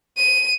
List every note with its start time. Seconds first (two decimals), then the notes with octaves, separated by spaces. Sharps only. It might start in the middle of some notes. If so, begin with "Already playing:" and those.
0.17 D#7